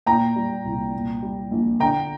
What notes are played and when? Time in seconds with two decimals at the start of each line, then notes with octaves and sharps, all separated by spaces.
0.06 A#2 G5 A#5
0.36 G3
0.65 C2
0.94 A#2
1.23 G3
1.51 A#1
1.80 D3 G5 A#5